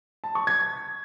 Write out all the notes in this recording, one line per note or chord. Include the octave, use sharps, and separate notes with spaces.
A5
C#6
G#6